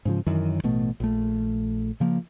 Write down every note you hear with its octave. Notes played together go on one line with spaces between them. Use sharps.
G#2 C#3 F3
F#2 D#3 E3
A1 B2 A3
A#1 A3
C#3 F3 A#3